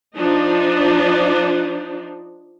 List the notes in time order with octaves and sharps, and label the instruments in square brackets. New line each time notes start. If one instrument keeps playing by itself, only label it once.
[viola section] F3 D4 D#4